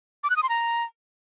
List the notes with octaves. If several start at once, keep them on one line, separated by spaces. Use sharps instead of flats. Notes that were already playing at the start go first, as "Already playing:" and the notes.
D6
F#6
D#6
C6
A#5